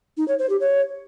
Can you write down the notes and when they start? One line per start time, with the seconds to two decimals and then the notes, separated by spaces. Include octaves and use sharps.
0.17 D#4
0.28 C#5
0.39 C5
0.49 G4
0.60 C#5